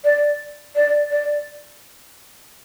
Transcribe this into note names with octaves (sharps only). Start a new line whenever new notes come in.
D5
D5
D5